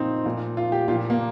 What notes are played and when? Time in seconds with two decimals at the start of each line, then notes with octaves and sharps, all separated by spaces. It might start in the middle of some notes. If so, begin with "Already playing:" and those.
Already playing: A#2 F3 C4 D#4
0.25 A#2 F3
0.57 F4
0.72 G4
0.88 A#2 F4
0.92 F3
1.10 A#3